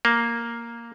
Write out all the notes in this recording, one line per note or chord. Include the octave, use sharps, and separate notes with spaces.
A#3